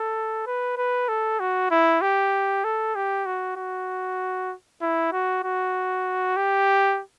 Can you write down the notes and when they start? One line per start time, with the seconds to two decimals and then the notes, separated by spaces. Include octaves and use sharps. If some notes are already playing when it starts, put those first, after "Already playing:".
Already playing: A4
0.46 B4
0.77 B4
1.08 A4
1.40 F#4
1.71 E4
2.02 G4
2.64 A4
2.95 G4
3.26 F#4
3.57 F#4
4.82 E4
5.12 F#4
5.44 F#4
6.36 G4